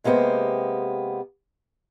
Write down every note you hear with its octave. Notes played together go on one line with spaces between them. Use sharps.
C3 G#3 A#3 B3 G4 C5